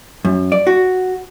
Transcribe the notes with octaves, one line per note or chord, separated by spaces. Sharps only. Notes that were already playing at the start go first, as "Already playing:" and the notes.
F#2
D5
F#4